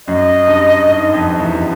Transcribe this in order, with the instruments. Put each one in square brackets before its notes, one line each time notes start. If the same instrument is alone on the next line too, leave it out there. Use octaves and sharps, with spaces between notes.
[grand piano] F#2 [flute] D#5
[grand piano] G2
G#2
F2
E2